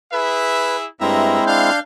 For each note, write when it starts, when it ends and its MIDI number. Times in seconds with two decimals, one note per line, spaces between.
0.12 0.87 64
0.12 0.87 68
0.12 0.76 71
0.12 0.87 76
1.01 1.39 43
1.01 1.70 56
1.01 1.43 58
1.01 1.70 60
1.01 1.70 64
1.01 1.43 76
1.01 1.43 82
1.47 1.80 62
1.47 1.77 77
1.47 1.80 91